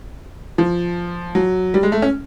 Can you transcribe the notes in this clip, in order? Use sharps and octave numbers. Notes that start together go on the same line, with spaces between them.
F3
F#3
G3
G#3
A3
C#4